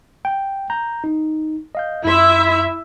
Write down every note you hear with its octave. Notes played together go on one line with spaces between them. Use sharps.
G5
A#5 G6
D#4
D#5 F5 G6
F#2 E4 E5 C6